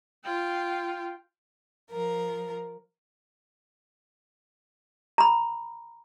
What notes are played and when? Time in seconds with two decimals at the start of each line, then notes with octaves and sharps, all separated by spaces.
0.24 F4 G5
1.90 F3 A#4
5.18 A#5 B5